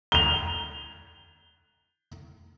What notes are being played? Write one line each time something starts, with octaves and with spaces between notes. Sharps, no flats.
F7 G7